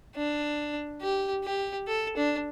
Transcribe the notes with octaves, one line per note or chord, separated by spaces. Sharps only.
D4
G4
G4
A4
D4